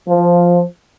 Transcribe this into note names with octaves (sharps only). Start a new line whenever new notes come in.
F3